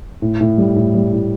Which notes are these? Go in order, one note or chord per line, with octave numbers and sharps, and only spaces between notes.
A2
A2
G3
A2
G3
A2